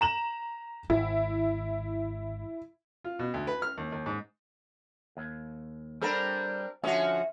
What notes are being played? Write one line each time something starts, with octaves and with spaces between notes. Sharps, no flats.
A#5 E7 F#7
G#1 E4
F4
B2
D2
B4
F6
D#2
D#2
G#2
D#2
G3 C4 D4 A4 A#4 B5
D3 F3 C#4 F#4 E5